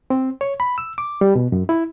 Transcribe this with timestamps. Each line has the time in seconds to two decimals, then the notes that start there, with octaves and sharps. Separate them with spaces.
0.10 C4
0.41 C#5
0.60 B5
0.78 E6
0.98 D6
1.21 G3
1.35 B2
1.52 F#2
1.69 E4